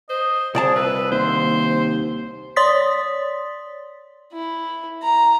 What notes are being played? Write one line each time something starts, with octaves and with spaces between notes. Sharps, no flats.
C5 D#5
C2 F3 G#4 D5 A5
B4 E5
D#2 C5 C6
C#5 D5 C6 D#6 A6 B6
E4
A#5